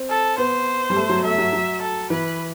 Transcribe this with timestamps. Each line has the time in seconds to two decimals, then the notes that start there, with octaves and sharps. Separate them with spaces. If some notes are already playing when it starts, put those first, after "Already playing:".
Already playing: C4
0.09 A4
0.38 B3 C5
0.90 G3
0.96 A3
1.09 F#3
1.24 A3 E5
1.38 F#3
1.53 F#3
1.81 A4
2.10 E3 B4